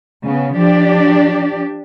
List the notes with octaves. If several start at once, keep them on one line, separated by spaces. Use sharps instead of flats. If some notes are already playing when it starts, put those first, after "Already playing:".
C#3 B3
F3 D4 G4 D5